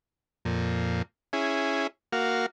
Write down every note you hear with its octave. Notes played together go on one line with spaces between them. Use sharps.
F2 A#2
C#4 E4 G#4
A#3 F#4 F5